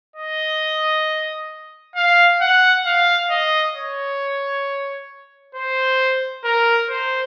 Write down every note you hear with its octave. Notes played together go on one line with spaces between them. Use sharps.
D#5
F5
F#5
F5
D#5
C#5
C5
A#4
C5